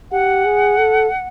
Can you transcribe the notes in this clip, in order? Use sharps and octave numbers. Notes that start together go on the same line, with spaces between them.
G4 F#5
G#4
A4